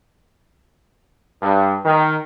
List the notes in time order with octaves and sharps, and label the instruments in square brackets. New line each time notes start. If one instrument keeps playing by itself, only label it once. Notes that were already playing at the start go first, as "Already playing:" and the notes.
[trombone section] G2
D#3